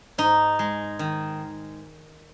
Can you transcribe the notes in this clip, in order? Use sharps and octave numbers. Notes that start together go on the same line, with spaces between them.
G#2 D#4
G#3
D#3